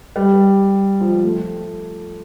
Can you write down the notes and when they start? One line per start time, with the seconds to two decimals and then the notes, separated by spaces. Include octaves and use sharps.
0.16 G3
1.01 F3
1.12 G3
1.24 A3